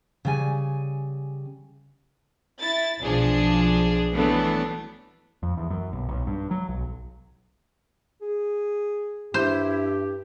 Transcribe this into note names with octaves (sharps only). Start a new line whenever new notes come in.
C#3 G3 G#5
E4 A6
B1 F3 D4 G#4
E3 F#3 A3 B3 D4
F2
E2
F#2
B1
B1
G2
F#3
B1
G#4
G2 E4 G4 C5